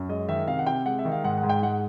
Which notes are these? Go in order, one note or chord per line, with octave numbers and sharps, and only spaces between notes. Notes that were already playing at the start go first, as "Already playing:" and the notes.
Already playing: F#2
G#3 D#5
D#3 E5
C3 F5
F#5
C3 G5
G#3 F#5
E5
D#3
F5
G#2 F#5
F#5
G#2
G5
G#3 F#5